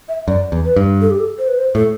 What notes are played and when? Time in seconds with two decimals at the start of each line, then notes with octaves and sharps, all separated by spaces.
0.09 E5
0.28 F#2 D5
0.52 E2
0.65 B4
0.76 G2
1.01 A4
1.11 G4
1.20 A4
1.38 C5
1.48 B4
1.58 C5
1.75 A2 A4